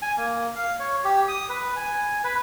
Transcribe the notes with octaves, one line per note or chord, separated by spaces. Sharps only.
G#5
A#3
F5
C#5
G4
D#6
B4
G#5
B4